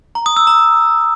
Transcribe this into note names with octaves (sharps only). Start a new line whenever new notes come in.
A#5
D#6
E6
A#5